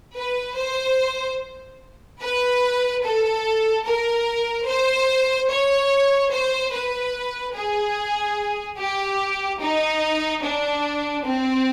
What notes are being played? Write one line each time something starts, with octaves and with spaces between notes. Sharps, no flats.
B4
C5
B4
A4
A#4
C5
C#5
C5
B4
G#4
G4
D#4
D4
C4